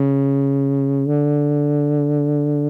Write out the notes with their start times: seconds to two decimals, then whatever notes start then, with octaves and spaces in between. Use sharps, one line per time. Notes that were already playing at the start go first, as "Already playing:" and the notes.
Already playing: C#3
1.07 D3